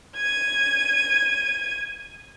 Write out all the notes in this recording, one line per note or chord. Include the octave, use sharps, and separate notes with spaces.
G#6 D#7